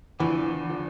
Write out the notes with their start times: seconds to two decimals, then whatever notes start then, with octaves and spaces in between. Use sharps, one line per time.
0.20 E2 D3 E3 F3
0.69 D3 F3